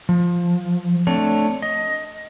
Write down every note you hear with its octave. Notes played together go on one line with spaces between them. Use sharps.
F3
A3 C4 D4 C#5
D#5